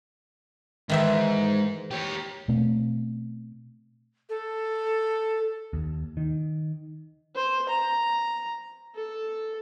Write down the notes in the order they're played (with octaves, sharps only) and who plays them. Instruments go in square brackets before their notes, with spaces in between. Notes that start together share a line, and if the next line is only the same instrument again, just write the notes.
[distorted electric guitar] G#2 [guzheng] D#3 E3 E5
[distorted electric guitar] G4 C#5
[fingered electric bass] B2 A3 C4
[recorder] A4
[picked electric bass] D#2
D#3
[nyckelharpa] C5
A#5
A4